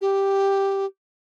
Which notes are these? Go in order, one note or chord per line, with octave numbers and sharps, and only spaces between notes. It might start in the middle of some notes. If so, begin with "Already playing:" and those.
G4